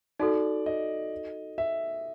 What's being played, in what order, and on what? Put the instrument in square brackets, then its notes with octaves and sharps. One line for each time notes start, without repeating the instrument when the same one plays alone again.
[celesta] D#4 F#4 A4 [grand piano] D5
[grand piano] D#5
E5